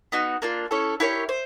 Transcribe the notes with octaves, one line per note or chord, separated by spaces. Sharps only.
B3 D#4 F#4
A#3 D4 F4
C#4 E4 A4 C#5
E4 G4 A#4 C#5
C5